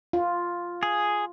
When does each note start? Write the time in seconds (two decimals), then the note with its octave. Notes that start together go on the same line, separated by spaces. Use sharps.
0.13 F4
0.83 G#4